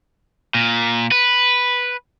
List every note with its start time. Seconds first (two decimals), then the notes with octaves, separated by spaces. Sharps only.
0.54 A#2
1.11 B4